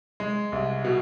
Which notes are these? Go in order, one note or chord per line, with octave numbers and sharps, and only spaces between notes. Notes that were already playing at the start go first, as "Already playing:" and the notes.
G#3
C2
B2